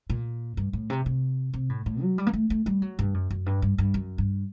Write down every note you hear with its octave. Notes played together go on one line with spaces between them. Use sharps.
A#2
G2
A2
C3
C3
C3
A2
A2
F#3
G3
A#3
A3
A3
G3
F#3
G2
F#2
F#2
G2
G2
G2
F#2
G2